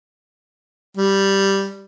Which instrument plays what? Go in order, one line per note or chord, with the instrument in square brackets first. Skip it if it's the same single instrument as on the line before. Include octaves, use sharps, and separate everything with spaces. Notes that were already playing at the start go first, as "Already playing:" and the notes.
[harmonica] G3